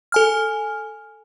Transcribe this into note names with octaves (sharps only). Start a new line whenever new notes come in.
A4 G#5 F6